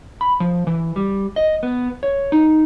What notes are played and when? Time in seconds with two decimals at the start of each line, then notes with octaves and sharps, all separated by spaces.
0.21 B5
0.40 F3
0.67 E3
0.96 G3
1.36 D#5
1.63 B3
2.03 C#5
2.32 D#4